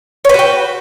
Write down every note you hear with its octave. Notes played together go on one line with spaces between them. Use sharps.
F#4 B4 C#5 G5